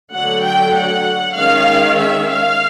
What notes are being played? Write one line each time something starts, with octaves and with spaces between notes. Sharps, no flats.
D3 F#3 A3 F#5
G5
F#5
D#3 G#3 C#4 F5
E5
F5